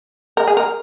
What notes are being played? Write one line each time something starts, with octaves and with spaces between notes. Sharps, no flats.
A#4
G#4
A#4